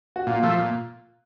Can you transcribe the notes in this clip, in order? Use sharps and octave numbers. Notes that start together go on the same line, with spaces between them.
F#4
A#2 F4
F3 A3
A#2